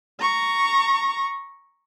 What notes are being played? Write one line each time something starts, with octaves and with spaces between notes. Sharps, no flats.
A#5 C#6